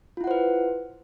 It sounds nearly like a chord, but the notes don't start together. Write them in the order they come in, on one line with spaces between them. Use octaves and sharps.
F4 E4 F#5 C5 B4